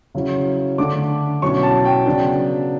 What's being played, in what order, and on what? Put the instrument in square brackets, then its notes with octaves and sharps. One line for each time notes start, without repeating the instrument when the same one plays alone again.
[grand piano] C#3 F#3 C#4 E4
D3 A3 D4 D6
B2 F#3 C#4 E4 C#6
A5
G5
C#3 F#3 B3 D4